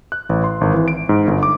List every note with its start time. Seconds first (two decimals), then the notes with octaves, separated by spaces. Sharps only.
0.12 F#6
0.29 A1
0.44 C6
0.61 G#1
0.74 E3
0.88 D7
1.09 G#2
1.27 G1
1.43 D6